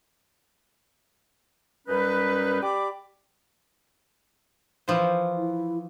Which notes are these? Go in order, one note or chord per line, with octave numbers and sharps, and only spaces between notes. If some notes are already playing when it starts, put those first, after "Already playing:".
F#2 G3 C#4 D#4 B4
G4 D5 B5 D6
E3 F3 C5
E4